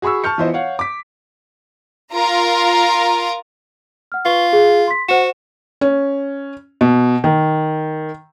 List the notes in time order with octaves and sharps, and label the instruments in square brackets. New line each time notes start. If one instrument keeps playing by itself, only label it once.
[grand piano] F#4 G#4 B5 C#6 E6
A5 C#6 F6 G6 C#7
E3 B3 E4 F4 C5 D#5
C#5 F5 F#5
D6 B6
[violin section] F4 A#4 A#5
[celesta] F#5 F6
[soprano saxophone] F4 [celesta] B4 C#6 G7
[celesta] G#4
C6 B6
[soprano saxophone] F#4 [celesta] C5 F#5 E7
[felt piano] C#4
B2
D#3